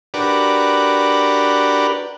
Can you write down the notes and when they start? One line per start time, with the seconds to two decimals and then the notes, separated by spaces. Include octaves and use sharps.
0.14 D4 F#4 G4 A#4 B4 D5